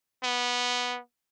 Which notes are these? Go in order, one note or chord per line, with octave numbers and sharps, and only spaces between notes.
B3